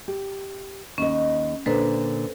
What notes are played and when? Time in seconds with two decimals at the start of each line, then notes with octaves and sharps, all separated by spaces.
0.08 G4
0.98 D#2 C#4 D#5
1.66 A#2 D3 D4 A4 B4 C5